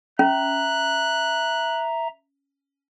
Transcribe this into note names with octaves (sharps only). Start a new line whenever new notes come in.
C#4 E5 A#5 F#6